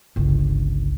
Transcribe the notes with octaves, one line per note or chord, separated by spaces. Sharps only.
G1 C#2